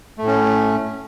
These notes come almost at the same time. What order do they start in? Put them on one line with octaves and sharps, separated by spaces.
A3 A2 C#4